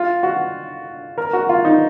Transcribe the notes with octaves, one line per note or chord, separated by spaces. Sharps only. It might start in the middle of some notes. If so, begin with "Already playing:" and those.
Already playing: F4
F#4
A#4
F#4
F4
D#4